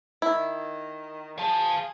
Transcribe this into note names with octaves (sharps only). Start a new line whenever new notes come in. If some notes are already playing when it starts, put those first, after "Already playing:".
D#3 E4
G#4 F5 A5